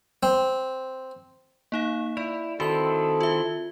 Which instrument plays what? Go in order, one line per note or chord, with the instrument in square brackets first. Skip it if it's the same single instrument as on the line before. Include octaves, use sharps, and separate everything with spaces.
[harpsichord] C4
[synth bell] A#3 D#4 F5
[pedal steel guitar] E4 [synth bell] D5
[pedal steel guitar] D#3 C4 E4 [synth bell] F#4 F#7 [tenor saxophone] A4
[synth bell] F4 E5